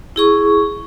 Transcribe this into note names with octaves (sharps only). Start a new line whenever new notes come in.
E4 G#4 C#6